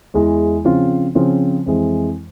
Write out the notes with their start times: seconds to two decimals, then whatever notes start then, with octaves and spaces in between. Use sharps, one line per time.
0.14 E2 E3 G#3
0.65 C#3 F3 C4 F4
1.15 C#3 F3 C4 F4
1.66 F2 E3 G#3